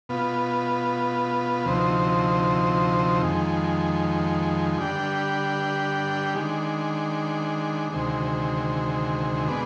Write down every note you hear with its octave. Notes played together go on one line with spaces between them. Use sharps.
B2 B3 F4
D2 C3 F3 C4 D#4
F2 D#3 G#3
D3 G3 D4 G4
D#3 G#3 D4
D2 C3 D#3 G#3
B2 G#3 D4